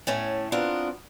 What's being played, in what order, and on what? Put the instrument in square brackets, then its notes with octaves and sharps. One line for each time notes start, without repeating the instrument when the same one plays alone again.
[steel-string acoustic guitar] A2 A3 C#4
B3 C4 D4 F4 A#4